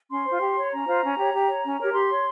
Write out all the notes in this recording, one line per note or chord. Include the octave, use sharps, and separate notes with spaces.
C#4 C6
F4 C5
G4
C#5
C#4 A#5
F4 C5
C#4
G4 C#5
G4
C#5
C#4
G4 A#4 C#5
G4 C6
C#5